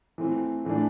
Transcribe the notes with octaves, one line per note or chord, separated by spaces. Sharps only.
E3 A3 C4
A2 E3 A3 D4